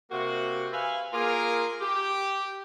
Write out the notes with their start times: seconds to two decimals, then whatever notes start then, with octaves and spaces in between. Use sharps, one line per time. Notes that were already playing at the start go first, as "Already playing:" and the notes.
0.11 C3 A#3 F#4
0.73 B4 E5 F5 G#5
1.13 A#3 F4 G#4 A#4
1.81 G4